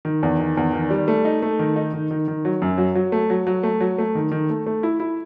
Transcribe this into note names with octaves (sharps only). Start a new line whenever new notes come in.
D#3
E2
D#3
E2
D#3
G3
A3
D#4
A3
D#3
D#4
D#3
D#3
D#3
F#3
F#2
F#3
F#3
A3
F#3
F#3
A3
F#3
A3
D#3
D#3
A3
A3
E4
E4